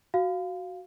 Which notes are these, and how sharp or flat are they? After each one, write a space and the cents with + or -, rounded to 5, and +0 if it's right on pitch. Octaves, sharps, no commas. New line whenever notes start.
F#4 +0 F5 +0